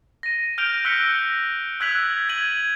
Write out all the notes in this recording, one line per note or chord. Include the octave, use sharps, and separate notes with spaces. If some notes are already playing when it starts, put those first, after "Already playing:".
A#6 D#7
F6 G6 D7 F7
E6 F#6 A#6 B6 C#7 G7
E6 F#6 G#6 B6 F7 F#7
G#6 D#7 F#7